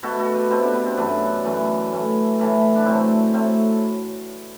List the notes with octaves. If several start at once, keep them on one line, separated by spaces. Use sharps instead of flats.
B2 A3 F#4 A4
F#4 A4
G4 B4
B2 A3 C4 E4
B3 D4
B3
C4
F#2 E3 A3 B3 D4
F#2 E3 A3
A2 E3 A3
A2 E3 A3
D4
A2 F#3 A3 C4 E4
A2 F#3 A3 C4